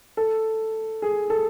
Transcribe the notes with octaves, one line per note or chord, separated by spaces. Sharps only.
A4
G#4
A4